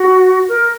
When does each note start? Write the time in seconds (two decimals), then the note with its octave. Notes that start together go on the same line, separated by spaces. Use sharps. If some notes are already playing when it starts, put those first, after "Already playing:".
Already playing: F#4
0.48 A#4